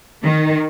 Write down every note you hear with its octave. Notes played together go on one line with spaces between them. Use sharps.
D#3